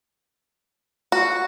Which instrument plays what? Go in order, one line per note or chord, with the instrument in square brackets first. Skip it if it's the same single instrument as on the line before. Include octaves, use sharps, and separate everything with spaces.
[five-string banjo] F#4